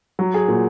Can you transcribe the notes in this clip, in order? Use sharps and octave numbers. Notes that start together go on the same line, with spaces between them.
F#3
G#4
A#2